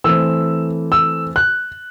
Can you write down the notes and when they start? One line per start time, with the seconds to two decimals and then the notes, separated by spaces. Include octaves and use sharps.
0.04 E3 A3 C4 E6
0.92 E6
1.36 F#6